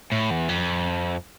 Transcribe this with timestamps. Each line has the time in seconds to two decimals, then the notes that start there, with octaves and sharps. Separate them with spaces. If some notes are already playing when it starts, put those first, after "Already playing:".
0.12 A2
0.30 E2
0.49 F2